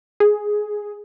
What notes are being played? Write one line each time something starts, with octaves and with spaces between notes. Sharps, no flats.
G#4